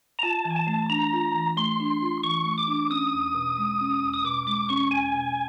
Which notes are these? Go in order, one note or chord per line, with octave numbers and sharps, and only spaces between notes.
A#5
F4 A5
E3
G#5
A5
A3
D4 A#5
F4
E3
A3 C6
D4
F4
E3 C#6
A3
D6
D4
C#4 D#6
E2
B2
G#3
C#4
E2
D#6
B2 D6
G#3 D6
C#4 C#6
E2 G#5
B2